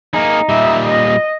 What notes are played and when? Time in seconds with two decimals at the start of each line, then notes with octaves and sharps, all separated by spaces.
0.14 A#3 D#4 G#4
0.49 A#2 G3 E5
0.87 D#5